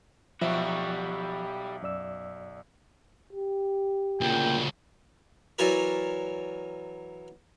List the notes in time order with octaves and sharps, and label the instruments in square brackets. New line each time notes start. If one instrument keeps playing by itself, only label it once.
[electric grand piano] B1 E5 [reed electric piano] F3 [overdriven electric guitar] G3 F#4
[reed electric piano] F#2 D5 E6
[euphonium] G4
[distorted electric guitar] D2 C#3 [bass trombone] A#2 [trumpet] G5
[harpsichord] E3 F#3 A#4 C#5 D5